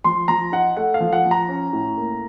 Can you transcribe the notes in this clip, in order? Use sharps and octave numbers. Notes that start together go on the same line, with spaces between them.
F3 C6
F3 A#5
D#4 F#5
A3 F#5
F5
F3
F#5
F3
A#5
C#4
A2
A#3